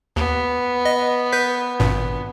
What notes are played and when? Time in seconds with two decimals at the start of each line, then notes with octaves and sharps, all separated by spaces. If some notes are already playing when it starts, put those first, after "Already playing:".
0.16 D#2 B3
0.85 D#5
1.32 B4 G6 B6
1.80 G#1 G2 A#2